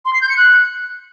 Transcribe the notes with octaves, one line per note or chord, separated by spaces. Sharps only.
C6
C7
G6
C#7
F#6